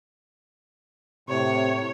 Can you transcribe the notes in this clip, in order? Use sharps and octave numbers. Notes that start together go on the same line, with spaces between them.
A2 C3 C#5